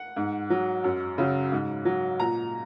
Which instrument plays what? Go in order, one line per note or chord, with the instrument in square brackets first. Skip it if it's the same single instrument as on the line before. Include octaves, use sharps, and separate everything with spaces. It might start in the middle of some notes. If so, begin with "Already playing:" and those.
Already playing: [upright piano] F#5
G#2
F#3
F#2
C#3 F#3
G#2
F#3
A#2 A#5